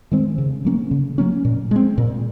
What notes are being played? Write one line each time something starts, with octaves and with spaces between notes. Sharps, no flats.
D#3 G#3 C4
C#3
F#3 A#3 C#4
C#3
F#3 A#3 C#4
A#2
G#3 C4
A#2